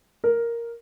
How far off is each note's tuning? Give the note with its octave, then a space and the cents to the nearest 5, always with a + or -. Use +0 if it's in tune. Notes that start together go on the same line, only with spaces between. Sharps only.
A#4 +0